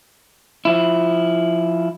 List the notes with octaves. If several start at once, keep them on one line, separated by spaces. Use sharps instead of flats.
F3 E4